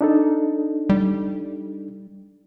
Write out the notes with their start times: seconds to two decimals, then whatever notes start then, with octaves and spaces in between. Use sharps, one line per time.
0.01 D4 D#4 A4
0.90 G3